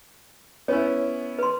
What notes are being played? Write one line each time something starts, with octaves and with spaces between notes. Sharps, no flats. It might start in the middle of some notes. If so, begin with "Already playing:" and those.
B3 C#4 E4 C#5
B4 C6